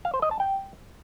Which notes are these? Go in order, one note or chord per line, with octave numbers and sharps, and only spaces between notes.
F5
C5
D#5
A5
G5